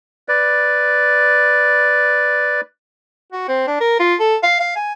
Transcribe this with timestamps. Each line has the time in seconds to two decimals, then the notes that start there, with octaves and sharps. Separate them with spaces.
0.28 B4 D5
3.33 F#4
3.48 C4
3.68 D4
3.81 A#4
4.00 F4
4.20 A4
4.43 F5
4.60 F5
4.76 G#5